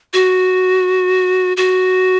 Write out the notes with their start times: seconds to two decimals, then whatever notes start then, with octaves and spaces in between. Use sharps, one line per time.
0.14 F#4
1.57 F#4